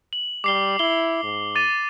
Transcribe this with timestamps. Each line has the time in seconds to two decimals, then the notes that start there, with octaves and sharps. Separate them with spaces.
0.13 F#7
0.44 G3 D6 C7 G7
0.79 E4 G7
1.23 G#2
1.55 D6 A6 D#7